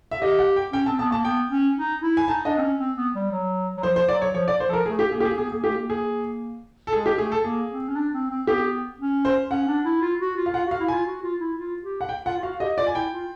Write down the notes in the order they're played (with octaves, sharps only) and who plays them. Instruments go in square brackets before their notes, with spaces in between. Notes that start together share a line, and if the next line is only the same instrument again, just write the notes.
[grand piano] E5
[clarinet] G4 [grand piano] D#5
[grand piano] F#5
G5
[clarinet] C#4 [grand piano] G5
[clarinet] C4 [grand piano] A5
[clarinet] B3 [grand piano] A5
[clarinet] A#3 [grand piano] A5
[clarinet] B3 [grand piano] G5
[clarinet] C#4
D#4
E4
[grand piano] G#5
[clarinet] D#4 [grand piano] A5
[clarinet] D4 [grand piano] D#5
[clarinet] C4
C#4
C4
B3
G3
F#3
F#3
[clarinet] F3 [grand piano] C5
[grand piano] C5
[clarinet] F#3 [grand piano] D5
[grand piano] C#5
[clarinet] F3 [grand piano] C#5
[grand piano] D5
C5
[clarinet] F3 [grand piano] A4
[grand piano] A#4
[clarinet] A3 [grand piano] G#4
[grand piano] G4
[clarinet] A#3 [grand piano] G#4
[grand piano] G4
G#4
[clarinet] B3 [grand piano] G#4
[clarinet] A#3 [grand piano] G#4
[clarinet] A3 [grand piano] G4
[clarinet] A#3
[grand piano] G#4
A4
[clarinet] G#3 [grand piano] G#4
[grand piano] G4
[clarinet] A3 [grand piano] G#4
[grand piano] A4
[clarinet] A#3 [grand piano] G#4
[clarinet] C4
C#4
D4
C4
C4
[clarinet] B3 [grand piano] G4
[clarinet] C#4
[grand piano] C5
[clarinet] C#4 [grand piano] F#5
[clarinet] D4
E4
F4
F#4
F4
[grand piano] F5
[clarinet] F4 [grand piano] F#5
[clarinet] F#4
[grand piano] F5
[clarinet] E4
[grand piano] G#5
[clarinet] F4
F#4
F4
E4
F4
G4
[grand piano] F#5
G5
[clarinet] F4 [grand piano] F#5
[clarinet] F4
[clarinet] F#4 [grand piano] F5
[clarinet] G4 [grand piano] D#5
[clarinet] F4 [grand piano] D5
[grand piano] G#5
[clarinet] E4 [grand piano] G5
[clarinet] F4